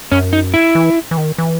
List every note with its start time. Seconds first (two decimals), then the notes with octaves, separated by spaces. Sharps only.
0.12 F#2 C#4
0.33 D#4
0.54 E4
0.75 E3
1.11 E3
1.17 D#3
1.38 E3